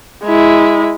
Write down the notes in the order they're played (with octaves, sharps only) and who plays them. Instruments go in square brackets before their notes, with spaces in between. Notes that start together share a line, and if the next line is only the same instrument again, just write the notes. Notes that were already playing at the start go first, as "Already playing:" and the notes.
[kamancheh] G#3 E4